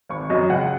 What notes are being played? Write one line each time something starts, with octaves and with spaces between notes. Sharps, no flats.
G#1 C#6
F#2 F#3 D#5
C#2 F#5